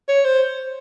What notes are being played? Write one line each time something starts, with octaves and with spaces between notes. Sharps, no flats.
C#5
C5